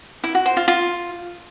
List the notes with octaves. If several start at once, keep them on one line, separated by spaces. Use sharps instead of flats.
E4
F#4
C5
F4
F4